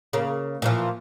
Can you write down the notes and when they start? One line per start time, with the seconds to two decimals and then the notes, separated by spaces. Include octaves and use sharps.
0.13 C#3 A#3
0.62 A#2 E3 F3